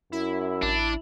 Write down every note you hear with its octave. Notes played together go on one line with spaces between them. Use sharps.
F#2 E4
A1 D4